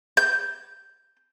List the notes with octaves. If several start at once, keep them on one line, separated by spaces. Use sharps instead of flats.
G6